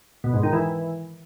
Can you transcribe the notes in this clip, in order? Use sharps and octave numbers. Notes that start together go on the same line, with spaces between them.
B2
G#2
D#3
E3